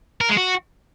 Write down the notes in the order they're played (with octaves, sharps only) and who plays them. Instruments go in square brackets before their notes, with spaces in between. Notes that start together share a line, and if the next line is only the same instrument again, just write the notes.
[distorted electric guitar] A#4
G#3
F#4